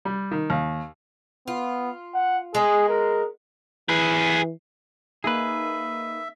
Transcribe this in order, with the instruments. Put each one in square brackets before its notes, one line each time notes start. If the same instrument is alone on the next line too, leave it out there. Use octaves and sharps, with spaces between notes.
[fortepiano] G3
D#3
D#2
[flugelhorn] B3 [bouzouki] F4
[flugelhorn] F#5
[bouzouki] G#3 B3 [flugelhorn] G#4
[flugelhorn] A#4
[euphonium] E3 [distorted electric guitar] G#4 B4
[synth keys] A#3 D#4 [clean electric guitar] G#4 B4 [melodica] E5